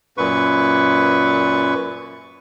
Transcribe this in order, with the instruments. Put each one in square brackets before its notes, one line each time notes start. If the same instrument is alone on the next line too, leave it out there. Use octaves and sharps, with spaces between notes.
[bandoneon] F#2 A#2 B4 C#6